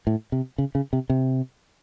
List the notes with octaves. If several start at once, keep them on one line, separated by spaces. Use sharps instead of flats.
A2
C3
C#3
C#3
C3
C3